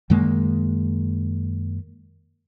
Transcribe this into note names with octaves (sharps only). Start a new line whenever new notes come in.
F#2 D#3 G#3 A#3